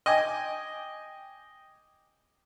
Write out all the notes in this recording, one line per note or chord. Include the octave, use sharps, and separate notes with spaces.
D#5 G5 G#5 D6